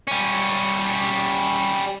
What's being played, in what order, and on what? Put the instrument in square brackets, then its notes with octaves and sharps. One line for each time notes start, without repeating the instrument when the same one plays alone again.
[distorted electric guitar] G3 C#4